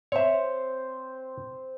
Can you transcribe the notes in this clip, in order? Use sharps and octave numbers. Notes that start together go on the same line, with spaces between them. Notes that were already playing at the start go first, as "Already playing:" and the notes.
C4 C5 C#5 E5